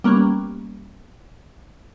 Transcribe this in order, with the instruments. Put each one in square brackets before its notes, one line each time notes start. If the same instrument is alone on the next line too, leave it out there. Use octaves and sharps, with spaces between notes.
[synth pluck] G3 A#3 B3 C#4